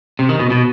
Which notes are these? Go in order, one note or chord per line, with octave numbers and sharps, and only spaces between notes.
C3
D#3
B2
B2